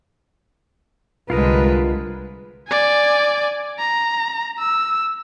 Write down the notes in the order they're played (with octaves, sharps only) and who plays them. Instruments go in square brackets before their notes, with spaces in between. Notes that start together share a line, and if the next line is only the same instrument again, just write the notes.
[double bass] C2 [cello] D3 G#3 [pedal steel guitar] F4 A#4 D#5 [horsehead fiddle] B4
[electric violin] D5 G#5
A#5
E6